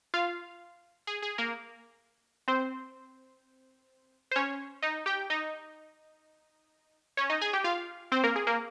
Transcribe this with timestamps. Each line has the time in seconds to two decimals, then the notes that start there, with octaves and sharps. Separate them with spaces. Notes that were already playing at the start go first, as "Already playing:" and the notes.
0.14 F4 F5
1.07 G#4
1.22 G#4
1.38 A#3 A#4
2.48 C4 C5
4.31 C5
4.36 C#4 C#5
4.82 D#4 D#5
5.06 G4 G5
5.30 D#4 D#5
7.17 C#4 C#5
7.30 D#4 D#5
7.41 G#4 G#5
7.53 G4 G5
7.64 F4 F5
8.12 C4 C5
8.23 A#3 A#4
8.36 G#4
8.47 A#3 A#4